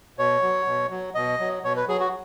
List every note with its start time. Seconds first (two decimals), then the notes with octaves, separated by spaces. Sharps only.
0.18 B2 C#5
0.42 F#3
0.66 B2
0.90 F#3
1.15 B2 D#5
1.40 F#3
1.64 B2 C#5
1.77 B4
1.88 F#3 G#4
2.00 F#4